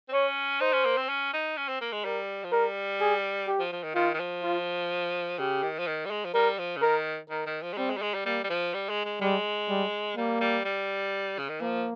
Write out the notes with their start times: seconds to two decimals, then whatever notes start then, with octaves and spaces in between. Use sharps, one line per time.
0.09 C4
0.13 C#4 C#5
0.61 D#4 C5
0.73 C#4
0.85 A#3
0.97 C4
1.09 C#4
1.33 D#4
1.57 C#4
1.68 C4
1.81 A#3
1.92 G#3
2.04 G3 A#4
2.44 F3
2.52 G3 A#4
3.00 G#4
3.48 G4
3.60 F3
3.72 F3
3.83 D#3
3.95 D#3 F4
4.14 D#3
4.20 F3
4.43 F4
5.39 C#3 G4
5.63 D#3
5.78 F3
5.87 D#3
6.05 G3
6.11 G#3
6.25 F3
6.34 G3 A#4
6.58 F3
6.77 C#3
6.82 D#3 A#4
7.30 D#3 A#4
7.46 D#3
7.62 F3
7.73 G#3
7.78 G3 C4
7.90 G#3
7.97 G3
8.02 G#3
8.14 G3
8.26 G3 A#3
8.44 G3
8.50 F3
8.74 G3
8.89 G#3
9.05 G#3
9.21 G3 G#3
9.69 G3
10.17 G3 A#3
10.41 G3
10.65 G3
11.38 C#3
11.49 D#3
11.61 F3 A#3